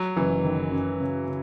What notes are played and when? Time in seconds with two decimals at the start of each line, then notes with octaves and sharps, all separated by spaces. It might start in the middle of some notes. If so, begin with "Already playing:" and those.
Already playing: F#3
0.16 F#1 E3
0.44 D#3
0.71 F#2
1.00 C#3
1.28 C#3